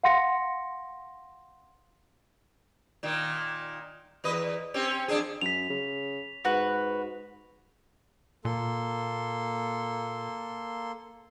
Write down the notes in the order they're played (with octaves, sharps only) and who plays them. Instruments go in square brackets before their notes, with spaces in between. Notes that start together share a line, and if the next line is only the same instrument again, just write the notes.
[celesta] F5 F#5 C6 A#6 C#7
[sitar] A#2 D#3
E2 B4 D#5
C4 C#4 G4
F2 D4 G#4
[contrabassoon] F#2 [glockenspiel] B6 F7
[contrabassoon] C#3
[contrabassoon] G#2 [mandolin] F#4 B4
[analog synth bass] A#2 [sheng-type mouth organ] A#3 A4 C6